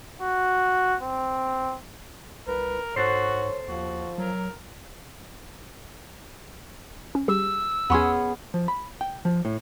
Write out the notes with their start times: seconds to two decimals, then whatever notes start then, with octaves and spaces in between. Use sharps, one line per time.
0.21 F#4
1.02 C4
2.47 C2 A#4 B4
2.96 G#2 F#4 A4 C5 C#5
3.68 D#2 F3 F#4
4.18 F#3 A#4
7.15 C#4
7.28 G3 G4 G#4 E6
7.90 E2 B3 C#4 G#4 C6
8.54 F3
8.68 B5
9.01 G5
9.25 F3
9.45 A2